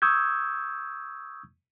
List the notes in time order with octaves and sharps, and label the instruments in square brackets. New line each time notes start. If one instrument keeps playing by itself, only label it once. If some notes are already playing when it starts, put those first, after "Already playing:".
[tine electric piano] C#6 D#6 E6 G6 G#6